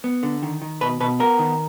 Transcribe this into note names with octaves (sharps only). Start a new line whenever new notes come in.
B3
D3
D#3
D#3
B2 B4
B2 B4
B3 A#4
D#3